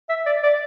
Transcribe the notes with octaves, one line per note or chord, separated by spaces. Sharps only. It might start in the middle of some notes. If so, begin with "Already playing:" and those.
E5
D5
D5